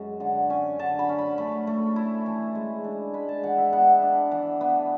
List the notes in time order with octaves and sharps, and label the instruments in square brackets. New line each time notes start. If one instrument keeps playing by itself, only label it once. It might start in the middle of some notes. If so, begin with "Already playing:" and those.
Already playing: [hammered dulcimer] F#2 G#3
D3 F#5
C#4 G#5
D3 A5
B5
C#4
B5
A3 B5
A3
E4
E3
G#3
D4
G#3 B5
A5
E3 F#5
E5
B3 F#5
D4
E3
B3